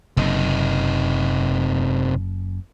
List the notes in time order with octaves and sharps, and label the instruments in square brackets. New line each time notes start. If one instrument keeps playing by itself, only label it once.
[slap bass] F#1 [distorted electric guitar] C3 D#4